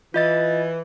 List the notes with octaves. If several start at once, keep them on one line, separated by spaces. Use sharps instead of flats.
E3 F4 D#5 A6